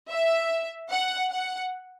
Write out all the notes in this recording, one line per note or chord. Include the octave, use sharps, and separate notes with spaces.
E5
F#5
F#5